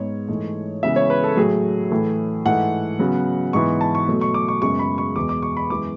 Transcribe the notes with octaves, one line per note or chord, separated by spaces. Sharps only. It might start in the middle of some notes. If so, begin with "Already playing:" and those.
Already playing: G#2 G#3 B3 C#5
G#2 E3 A3
C#3 E3 G#3 B3 E5
C#5
B4
A4
A2 F#3 A3 G#4
A2 E3 A3
G#2 E3 A3 F#5
C#3 F#3 B3
G#2 E3 B3 C#6
A5
C#6
B2 F#3 A3
C#6
D6
C#6
F#2 C#3 G#3 B3 C#6
B5
C#6
E2 B2 G#3 D6
D6
C#6
B5
F#2 E3 G#3 B3 D6